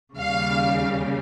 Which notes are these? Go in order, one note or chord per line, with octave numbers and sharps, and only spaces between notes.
D#2 C#3 G3 F5